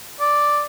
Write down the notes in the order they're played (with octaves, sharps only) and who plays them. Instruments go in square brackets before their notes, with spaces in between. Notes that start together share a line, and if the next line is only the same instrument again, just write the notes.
[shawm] D5